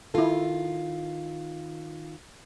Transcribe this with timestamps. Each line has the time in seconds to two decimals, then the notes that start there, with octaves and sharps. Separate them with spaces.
0.14 D#3 E4 F4 A4